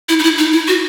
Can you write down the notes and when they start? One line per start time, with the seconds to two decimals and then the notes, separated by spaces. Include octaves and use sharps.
0.09 E4
0.19 D#4
0.23 E4
0.38 D#4
0.53 E4
0.68 F#4